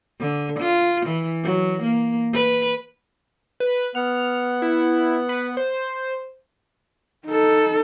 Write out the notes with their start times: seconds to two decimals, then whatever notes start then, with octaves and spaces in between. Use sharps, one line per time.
0.20 D3
0.59 F4
1.06 E3
1.44 F#3
1.82 A#3
2.33 B4
3.60 B4
3.95 B3 F#5 F6
4.62 E4
5.29 B4
5.57 C5
7.26 D#4 A4